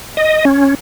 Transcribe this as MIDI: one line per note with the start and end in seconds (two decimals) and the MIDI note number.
0.17 0.45 75
0.45 0.75 61